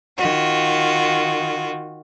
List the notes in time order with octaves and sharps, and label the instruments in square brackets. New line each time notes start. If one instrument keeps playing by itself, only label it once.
[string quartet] D#3 F4 F#4